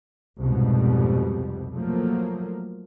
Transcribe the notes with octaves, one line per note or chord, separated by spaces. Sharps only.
C2 F2 G#2 B2 G3
F3 F#3 A3 A#3